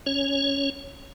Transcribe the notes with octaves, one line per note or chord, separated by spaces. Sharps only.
C#4 C#5